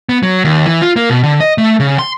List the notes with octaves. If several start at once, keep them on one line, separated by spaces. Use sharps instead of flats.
B3
F#3
D#2
E3
F4
A#3
B2
D3
D#5
A3
C#3
C6